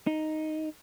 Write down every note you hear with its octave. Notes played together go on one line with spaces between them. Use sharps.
D#4